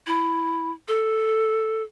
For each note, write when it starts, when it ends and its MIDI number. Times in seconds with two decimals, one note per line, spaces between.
0.07 0.71 64
0.88 1.83 69